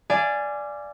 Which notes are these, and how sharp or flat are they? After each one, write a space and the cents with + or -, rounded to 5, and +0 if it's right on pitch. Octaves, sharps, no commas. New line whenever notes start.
D5 +0 F5 -35 G#5 +0